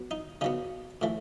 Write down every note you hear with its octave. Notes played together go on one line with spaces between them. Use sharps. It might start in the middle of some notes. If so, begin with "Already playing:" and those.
Already playing: F#3 B3
D#4
C#3 F#3 B3 D#4
A2 E3 A3